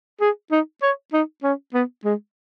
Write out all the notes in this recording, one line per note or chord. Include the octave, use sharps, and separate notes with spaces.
G#4
D#4
C#5
D#4
C#4
B3
G#3